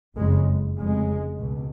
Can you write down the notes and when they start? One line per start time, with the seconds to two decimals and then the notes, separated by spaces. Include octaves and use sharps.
0.16 F#1 F2 C#3 G#3
0.77 F1 F2 C#3 G#3
1.39 C#2 B2